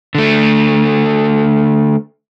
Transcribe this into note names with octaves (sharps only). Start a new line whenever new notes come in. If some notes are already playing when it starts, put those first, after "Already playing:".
D3 A3